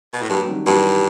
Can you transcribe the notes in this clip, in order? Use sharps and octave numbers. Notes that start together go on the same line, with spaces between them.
B2
A2
G2 F#3
G3
D#3 F#3
G2 E3 G3